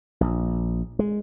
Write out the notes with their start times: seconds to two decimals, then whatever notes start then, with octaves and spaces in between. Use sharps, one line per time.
0.21 A#1
0.99 G#3